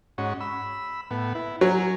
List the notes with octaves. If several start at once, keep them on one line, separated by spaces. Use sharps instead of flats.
G#2 C#4 F#4
B5 E6
A2 B3
E4
F#3 A#4 G#5